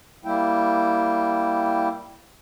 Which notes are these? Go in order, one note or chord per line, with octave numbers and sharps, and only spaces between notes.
G3 A#3 E4 G5